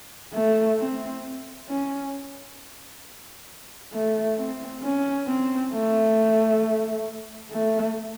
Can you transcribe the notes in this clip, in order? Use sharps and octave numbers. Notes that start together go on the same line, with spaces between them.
A3
C4
C#4
A3
C4
C#4
C4
A3
A3